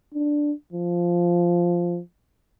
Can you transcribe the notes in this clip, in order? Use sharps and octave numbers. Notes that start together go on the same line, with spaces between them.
D4
F3